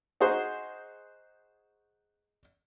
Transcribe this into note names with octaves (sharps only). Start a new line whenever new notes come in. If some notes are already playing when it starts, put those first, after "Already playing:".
D#4 F#4 G#4 C5